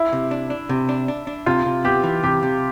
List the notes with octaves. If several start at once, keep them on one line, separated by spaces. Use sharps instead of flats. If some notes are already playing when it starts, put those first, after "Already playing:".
Already playing: E4
C3
D4
D4
C3
D4
D4
D4
C3 F4
C3
B3 G4
E3
C3 G4
C3